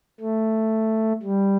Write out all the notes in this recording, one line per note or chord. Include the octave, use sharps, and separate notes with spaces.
A3
G3